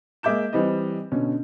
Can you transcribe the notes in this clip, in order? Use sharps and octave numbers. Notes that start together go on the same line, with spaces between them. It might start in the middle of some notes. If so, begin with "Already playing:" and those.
G#3 A#3 E5 D6 G6 E7
E3 G3 C4 D#5
B2 D3 C#4